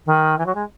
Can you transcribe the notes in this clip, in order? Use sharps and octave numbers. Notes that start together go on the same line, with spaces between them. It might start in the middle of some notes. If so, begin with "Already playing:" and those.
D#3
E3
F#3
G#3